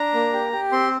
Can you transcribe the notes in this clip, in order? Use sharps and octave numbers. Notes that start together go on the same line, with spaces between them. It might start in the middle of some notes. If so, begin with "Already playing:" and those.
Already playing: D4 A#5
A#3
G4
G4
C4 C6